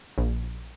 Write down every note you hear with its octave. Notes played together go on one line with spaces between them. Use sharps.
A#1